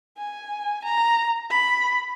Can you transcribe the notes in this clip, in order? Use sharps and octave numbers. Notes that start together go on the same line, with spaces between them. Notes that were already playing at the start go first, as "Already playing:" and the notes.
G#5
A#5
B5